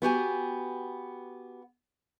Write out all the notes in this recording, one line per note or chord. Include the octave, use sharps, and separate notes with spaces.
B3 F#4 G4 G#5